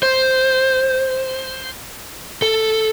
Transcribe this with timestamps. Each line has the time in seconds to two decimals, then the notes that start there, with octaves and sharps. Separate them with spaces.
0.03 C5
2.42 A4